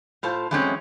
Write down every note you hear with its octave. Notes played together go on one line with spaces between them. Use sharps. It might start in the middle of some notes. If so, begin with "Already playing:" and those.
A2 F4 A4 C5 A5
E3 F#3 G#3 A3 C4 C#4